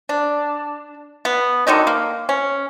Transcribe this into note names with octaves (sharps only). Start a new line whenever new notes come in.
D4
B3
D3 D#3 F#3 D#4
A#3
C#4